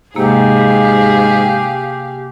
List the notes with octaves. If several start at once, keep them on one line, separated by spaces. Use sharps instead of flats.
G#2 C3 A#3 G4 G#4 F5